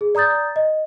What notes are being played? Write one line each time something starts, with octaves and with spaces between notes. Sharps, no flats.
G#4
D5 A#5 D#6 G6 A6
D#5